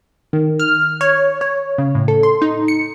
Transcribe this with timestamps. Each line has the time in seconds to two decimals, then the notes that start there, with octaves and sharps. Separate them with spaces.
0.33 D#3
0.60 F6
1.01 C#5
1.41 C#5
1.78 C#3
1.95 A2
2.08 A4
2.23 C6
2.42 D#4
2.68 C#7